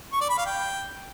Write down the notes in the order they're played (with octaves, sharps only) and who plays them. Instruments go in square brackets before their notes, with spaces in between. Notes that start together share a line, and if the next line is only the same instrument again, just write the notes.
[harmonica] C#6
D5
B5
F5
G5